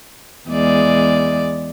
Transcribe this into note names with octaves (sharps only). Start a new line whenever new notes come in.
E2 G#3 D5